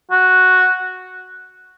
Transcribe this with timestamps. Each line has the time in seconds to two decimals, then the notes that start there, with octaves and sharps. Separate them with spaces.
0.11 F#4